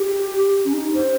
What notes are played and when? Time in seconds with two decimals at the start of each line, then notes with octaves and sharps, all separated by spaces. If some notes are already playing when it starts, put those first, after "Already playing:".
Already playing: G4
0.65 C#4
0.73 D#4
0.94 C5